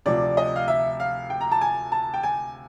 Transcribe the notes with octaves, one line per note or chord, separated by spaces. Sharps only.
D2 C3 F3 D5
D#5
F5
E5
F5
G5
A#5
A5
G#5
A5
G5
G#5